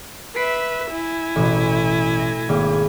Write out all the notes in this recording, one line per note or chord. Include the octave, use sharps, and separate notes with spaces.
B4 E5 B6 C7 D7
E4 G#5
A1 B2
A#6
G#1 A#3